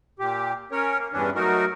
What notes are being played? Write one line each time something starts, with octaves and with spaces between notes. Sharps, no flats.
A#2 G4
C#4 A#4 C#5
A#3
E2 G2 E3 C#4 D4
F#3 A3 D#4 F#4 A#4